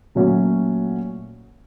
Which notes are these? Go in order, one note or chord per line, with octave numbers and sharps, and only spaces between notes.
A#2 F#3 A3 C#4 F#4